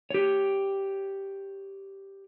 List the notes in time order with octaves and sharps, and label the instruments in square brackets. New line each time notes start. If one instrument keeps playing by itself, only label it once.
[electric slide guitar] G4 C#5